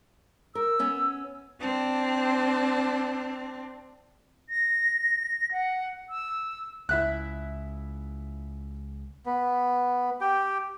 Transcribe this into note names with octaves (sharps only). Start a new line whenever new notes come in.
A#4 E6
B3 C#4 F#5
C4 D4
A#6
F#5
E6
C#2 E4 E5 F#6
B3
G4 G5